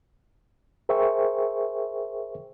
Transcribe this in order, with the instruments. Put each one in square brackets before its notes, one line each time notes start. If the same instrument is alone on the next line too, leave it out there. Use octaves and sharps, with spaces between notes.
[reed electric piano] G#4 A#4 C5 E5 G5 C#6